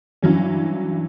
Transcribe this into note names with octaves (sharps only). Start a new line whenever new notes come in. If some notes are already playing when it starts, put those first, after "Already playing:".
G2 E3 F#3 C#4